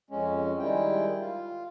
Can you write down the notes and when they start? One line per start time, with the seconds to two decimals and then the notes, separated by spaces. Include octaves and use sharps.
0.10 F2 G#3 C#4
0.59 D#3 G3 G#3 E4 G5
1.20 F4